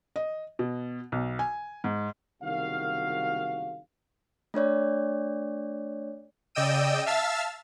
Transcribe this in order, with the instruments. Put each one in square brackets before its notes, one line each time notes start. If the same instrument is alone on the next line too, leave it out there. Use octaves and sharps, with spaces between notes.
[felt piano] D#5
B2
B1
G#5
G#2
[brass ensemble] F#1 C2 D#3 F#4 F5
[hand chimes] A3 D4 C#5 D5
[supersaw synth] C#3 D5 D#5 G5 E6 D#7
E5 F5 A5 E6 F6 A6